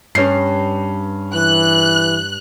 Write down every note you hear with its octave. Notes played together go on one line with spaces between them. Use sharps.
G2 C#4 C7
E3 F#6